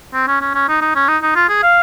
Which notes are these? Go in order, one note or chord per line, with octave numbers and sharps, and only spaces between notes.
C4
C#4
C#4
C#4
D#4
D#4
C#4
D#4
D#4
F4
G#4
F5